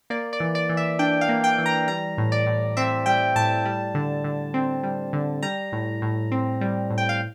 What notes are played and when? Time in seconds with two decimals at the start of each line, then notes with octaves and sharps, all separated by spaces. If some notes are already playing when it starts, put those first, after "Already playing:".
0.10 A#3 D5
0.33 D5
0.40 E3
0.55 D5
0.69 E3
0.77 E5
0.99 D4 G5
1.21 F5
1.29 A#3
1.44 G5
1.58 E3
1.66 A#5
1.88 G3 A#5
2.18 A2
2.32 D5
2.47 A2
2.77 C4 E5
3.06 G3 G5
3.36 A2 A5
3.65 G3
3.95 D3
4.24 D3
4.54 C4
4.84 G3
5.13 D3
5.43 G3 A#5
5.72 A2
6.02 A2
6.31 C4
6.61 G3
6.90 A2
6.98 G5
7.09 F5